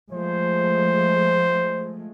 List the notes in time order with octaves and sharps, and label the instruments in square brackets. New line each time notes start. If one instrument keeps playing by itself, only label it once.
[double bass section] F3 G#3 A3 [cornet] C5